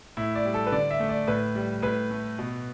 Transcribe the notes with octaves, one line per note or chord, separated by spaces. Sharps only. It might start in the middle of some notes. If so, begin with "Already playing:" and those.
A2 E4
D5
G3
A4
B4
D3 D5
E5
A3
D5
A2 B4
G3
A2 B4
A3
B2